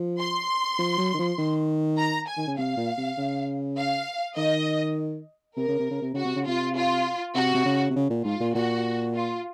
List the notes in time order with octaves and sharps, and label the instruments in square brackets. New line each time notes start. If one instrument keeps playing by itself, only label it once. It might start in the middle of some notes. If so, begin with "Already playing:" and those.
Already playing: [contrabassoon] F3
[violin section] C6
[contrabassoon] F3
F#3
D#3
F3
D#3
[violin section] A#5
G#5
[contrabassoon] D#3
C#3
[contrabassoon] C3 [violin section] F5
[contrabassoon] A#2
C3
C#3
[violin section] F5
[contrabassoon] D#3 [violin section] D#5
[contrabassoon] C3 [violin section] A#4
[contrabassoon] C#3
C3
C#3
C3
[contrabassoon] C#3 [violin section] F#4
[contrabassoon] C3
C#3
[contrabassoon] C3 [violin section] F4
[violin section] F4
[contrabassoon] C3 [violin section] F#4
[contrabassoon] C3
C#3
C3
C#3
A#2
[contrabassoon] G#2 [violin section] F4
[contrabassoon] A#2
[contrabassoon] A#2 [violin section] F#4
[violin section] F4